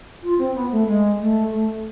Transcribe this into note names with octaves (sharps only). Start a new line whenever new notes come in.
F4
C4
B3
A3
G#3
A3
A3